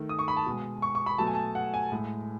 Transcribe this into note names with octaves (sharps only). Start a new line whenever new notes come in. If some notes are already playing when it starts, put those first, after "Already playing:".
Already playing: D#3 A3
D#6
C#6
B5
A5
B2 G#3
C#6
C#6
B5
B2 F#3 A3 A5
G#5
A5
F#5
G#5
A2 G#3